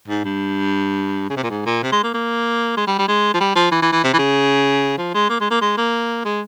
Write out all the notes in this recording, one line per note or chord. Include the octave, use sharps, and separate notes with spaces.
G#2
G2
C#3
C3
A#2
G#2
A#2
C3
G#3
A#3
A#3
G#3
G3
G3
G#3
F3
G3
F3
E3
E3
E3
C3
E3
C#3
F3
G#3
A#3
G#3
A#3
G#3
A#3
G#3